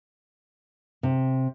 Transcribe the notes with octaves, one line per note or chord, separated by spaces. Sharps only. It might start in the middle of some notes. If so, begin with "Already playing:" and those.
C3